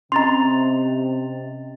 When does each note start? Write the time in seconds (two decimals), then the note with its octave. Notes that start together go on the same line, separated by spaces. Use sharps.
0.12 C3 C#4 D#5 A#5 C6 A6 F7